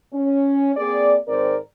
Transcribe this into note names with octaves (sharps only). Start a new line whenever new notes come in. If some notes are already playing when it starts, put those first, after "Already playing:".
C#4
A#3 C4 G#4 D5
G#2 D#3 C4 A#4 C5 D5